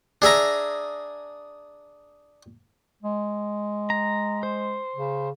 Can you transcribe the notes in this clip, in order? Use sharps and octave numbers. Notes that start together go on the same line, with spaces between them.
D4 G#4 E5 A#5
G#3
A#5
C5
C#3